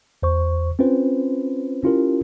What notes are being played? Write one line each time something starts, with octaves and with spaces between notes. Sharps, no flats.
E2 C5 C#6
C4 C#4 F4 B4 C5
C#4 E4 F4 G4 A#4